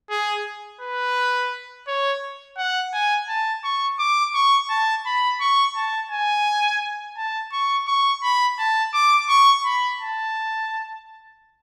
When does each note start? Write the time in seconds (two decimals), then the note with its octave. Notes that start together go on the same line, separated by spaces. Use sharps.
0.10 G#4
0.81 B4
1.87 C#5
2.58 F#5
2.93 G#5
3.29 A5
3.64 C#6
3.99 D6
4.35 C#6
4.70 A5
5.06 B5
5.40 C#6
5.76 A5
6.11 G#5
7.17 A5
7.52 C#6
7.87 C#6
8.23 B5
8.59 A5
8.94 D6
9.29 C#6
9.65 B5
10.00 A5